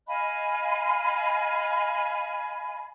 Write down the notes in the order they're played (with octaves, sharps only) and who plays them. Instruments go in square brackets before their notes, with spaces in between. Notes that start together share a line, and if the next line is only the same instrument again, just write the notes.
[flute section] D#5 F5 G#5 B5